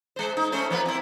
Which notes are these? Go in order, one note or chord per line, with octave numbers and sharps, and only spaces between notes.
G#3 C5
D#4
A3 C#4 C5
F3 A#3 B4
C4 E4